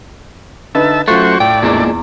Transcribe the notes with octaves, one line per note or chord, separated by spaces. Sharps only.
D3 D#4 B4 E5 A5
F#2 A3 F4 F#4 C5 C#6
A2 D5 G5
E2 A#2 G#3 D4